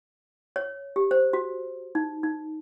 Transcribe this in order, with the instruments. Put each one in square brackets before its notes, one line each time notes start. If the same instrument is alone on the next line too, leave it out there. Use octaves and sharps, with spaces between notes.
[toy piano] C#5
G4
C5
F#4
D#4
D#4